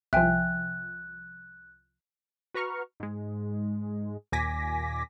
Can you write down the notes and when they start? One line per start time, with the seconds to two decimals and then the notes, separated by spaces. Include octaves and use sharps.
0.13 C2 F3 E5 G5 G#5 F#6
2.54 F#4 B4 A#5 C#6 F6
3.00 G#2 G#3
4.32 D#2 A#2 G#5 D6 A#6 B6